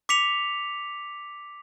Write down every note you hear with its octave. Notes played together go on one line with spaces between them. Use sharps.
D6 B6 C#7 F7